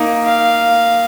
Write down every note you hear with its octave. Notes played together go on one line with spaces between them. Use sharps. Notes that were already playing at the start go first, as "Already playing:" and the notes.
Already playing: A#3 D#4 A#4
F5